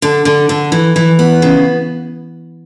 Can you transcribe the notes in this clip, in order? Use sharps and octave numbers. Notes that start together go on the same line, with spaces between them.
D3
D3
D3
E3
E3
B3
C#3